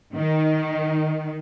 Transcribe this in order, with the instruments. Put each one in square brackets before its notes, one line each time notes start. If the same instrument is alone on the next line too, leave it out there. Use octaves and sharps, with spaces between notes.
[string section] D#3